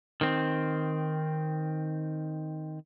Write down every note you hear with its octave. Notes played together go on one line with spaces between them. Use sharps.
D#3 C4